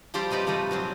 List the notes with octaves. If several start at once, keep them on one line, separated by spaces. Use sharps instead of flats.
F3 G3 G4 C5 D5
C3 D#4 B4 D5
F3 G3 A3 D#4
A#2 F3 F#3 C4